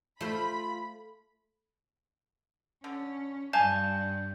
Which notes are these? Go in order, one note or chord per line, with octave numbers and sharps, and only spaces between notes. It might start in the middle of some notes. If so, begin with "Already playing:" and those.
A3 F4 C5 B5
D3 C#4
G2 D4 F5 G#5 A5 G6